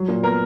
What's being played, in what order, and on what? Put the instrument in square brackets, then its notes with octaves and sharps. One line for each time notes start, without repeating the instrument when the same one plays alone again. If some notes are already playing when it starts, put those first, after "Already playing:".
Already playing: [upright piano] F#3
A#2
B3 A#4